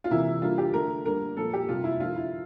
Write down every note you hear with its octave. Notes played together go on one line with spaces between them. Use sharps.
F4
C3 E3 A#3 E4
D3 G3 A#3 F4
G4
D3 A3 A#4
D3 G3 A#3 A#4
A#2 F3 A#3 A4
G4
C3 G3 A#3 F4
E4
D3 F3 A#3 F4
E4